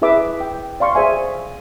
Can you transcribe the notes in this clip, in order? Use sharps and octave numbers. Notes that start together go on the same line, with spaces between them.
E4 G#4 B4 E5 D6
G5
D5 F5 C6 C#6
G#4 C5 E5 G#5